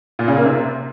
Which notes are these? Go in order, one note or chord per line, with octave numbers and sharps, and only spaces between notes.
A#2
C#3
A#3
C3